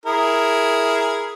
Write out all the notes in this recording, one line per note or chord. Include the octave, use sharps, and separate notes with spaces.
E4 G#4 A#4